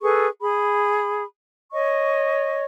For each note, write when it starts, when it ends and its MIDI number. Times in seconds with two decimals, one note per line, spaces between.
0.01 0.28 68
0.01 0.28 69
0.01 0.28 71
0.01 0.28 85
0.41 1.24 68
0.41 1.24 83
1.72 2.65 73
1.72 2.65 75
1.72 2.65 85